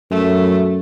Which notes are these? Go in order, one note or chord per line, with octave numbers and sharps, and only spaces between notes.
F#2 A3